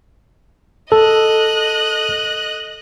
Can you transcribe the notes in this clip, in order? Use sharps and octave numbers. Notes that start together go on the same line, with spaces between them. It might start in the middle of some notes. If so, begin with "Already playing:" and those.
A4 D#5 F#6